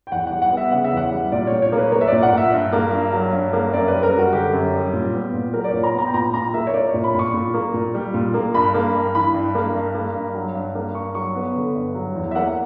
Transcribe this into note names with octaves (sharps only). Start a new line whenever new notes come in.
G5
E2 F#5
G3 F#5
F#5
B3
E5
C#3 F#5
E5
E2 F#5
G3
A#2 D5
A#2 C#5
C#5
A#3
B4
A#3 C#5
E5
A#2 D5
F#5
A#2 E5
G2
A#3
G2
F#3
G2
A#3
F#2 D5
B4
G3
A#4
F#2
F#4
D3 G4
F#2
G3
A#2
B3
A#2
F#3 A#4
D5
A#2 C#5
A#5
B3
A#5
G5
A#2 A#5
A#2 A#5
A#3 E5
C#5
A#3 D5
A#2 C#5
B5
A#2 C#6
A#2
A#3
A#2
G3
A#2
A#3
G2 B5
A#3
G2
E3 B5
G2
A#3
G2
A#3
G2
F#3
G2
A#3
G2 C#6
F#3 C#6
B3
D3
G2
F#3
E2
E5
A#3 F#5